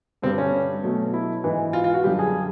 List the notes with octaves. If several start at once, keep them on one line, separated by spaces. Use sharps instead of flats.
G2 D3 G3 C4
C#4
B2 F#3 A3
E4
G#2 E3 G#3
F4
F4
F#4
F#2 D3 G3 G4
G#4